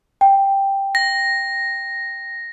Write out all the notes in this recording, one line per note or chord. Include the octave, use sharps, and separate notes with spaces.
G5
A#6